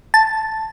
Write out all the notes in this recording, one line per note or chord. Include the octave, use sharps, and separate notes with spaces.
A5